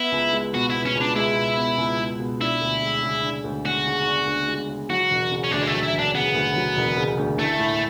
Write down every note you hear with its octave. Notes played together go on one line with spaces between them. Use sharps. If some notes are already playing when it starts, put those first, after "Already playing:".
Already playing: B3 E4
C#2
G#3
B2 F#4
B3 E4
C#4
C#2
D4
G#3 E4
B2
B3
C#2
G#3
B2
D4 E4
D2
G#3
C#3
D4
D2
G#3 F#4
C#3
D4
D2
G#3
C#3
F#3 F#4
E1
C#3
C#4
D2 D4
G#3
A3
F#3
E4
E1
D4
C#3 B3
D2
F#3
E1
C#3
D2
A3 E4
A2